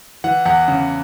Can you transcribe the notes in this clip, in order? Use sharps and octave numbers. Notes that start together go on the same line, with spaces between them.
E3 F#5
E2 F#5
C#3